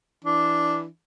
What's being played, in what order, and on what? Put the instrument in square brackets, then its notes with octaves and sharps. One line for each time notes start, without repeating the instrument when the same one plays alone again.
[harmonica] E3 D4